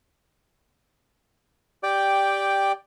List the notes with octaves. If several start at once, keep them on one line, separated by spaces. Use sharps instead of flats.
G4 D5 G5